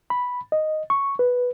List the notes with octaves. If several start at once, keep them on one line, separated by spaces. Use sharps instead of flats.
B5
D#5
C#6
B4